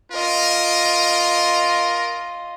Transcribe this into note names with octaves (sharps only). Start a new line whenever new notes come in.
F4 A#4 D#5